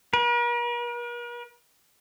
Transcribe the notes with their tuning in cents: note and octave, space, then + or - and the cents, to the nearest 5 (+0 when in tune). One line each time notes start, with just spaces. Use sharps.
A#4 +45